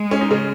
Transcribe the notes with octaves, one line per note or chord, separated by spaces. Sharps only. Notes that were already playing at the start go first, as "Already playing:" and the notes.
Already playing: G#3
C#4
D#4
C#3 C#4